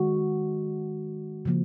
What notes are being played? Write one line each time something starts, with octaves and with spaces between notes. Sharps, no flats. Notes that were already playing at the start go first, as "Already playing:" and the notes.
Already playing: D#3 G#3 F#4
C#3 F3 A#3